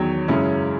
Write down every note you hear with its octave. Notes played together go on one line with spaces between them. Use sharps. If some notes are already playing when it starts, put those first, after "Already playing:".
Already playing: E2 D#3 F#3 C#5
F#2 C#3 G#3 C#4 E4